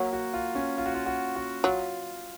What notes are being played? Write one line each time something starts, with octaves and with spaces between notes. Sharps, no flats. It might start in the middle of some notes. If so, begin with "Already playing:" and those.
Already playing: F#3 A#3
F#4
F4
C#4
F4
F#4
F4
F#4
F#4
F#3 F4